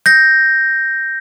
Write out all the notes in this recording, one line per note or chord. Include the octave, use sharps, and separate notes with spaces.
G6 A#6